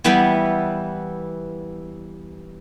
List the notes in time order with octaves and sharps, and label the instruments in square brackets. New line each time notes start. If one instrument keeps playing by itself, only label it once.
[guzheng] E3 G3 B3 G5